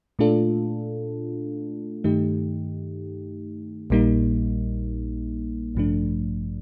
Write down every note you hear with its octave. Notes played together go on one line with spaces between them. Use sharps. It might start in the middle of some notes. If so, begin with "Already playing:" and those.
A#2 A3 D4 F4 A4
G2 D#3 A3 D#4 G4
A#1 A#2 G3 A#3 D#4
A1 G2 F3 A3 D4